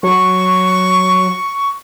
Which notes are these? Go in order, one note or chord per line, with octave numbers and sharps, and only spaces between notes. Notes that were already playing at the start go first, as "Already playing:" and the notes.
F#3 C#6